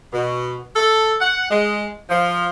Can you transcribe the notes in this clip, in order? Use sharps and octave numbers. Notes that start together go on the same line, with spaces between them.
B2
A4
F#5
G#3
F3